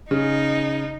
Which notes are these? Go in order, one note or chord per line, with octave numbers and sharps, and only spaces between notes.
C#3 D#4